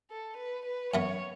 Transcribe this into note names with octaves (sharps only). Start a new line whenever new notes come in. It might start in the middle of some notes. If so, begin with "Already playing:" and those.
A4
B4
B4
F#2 E3 B3 C#5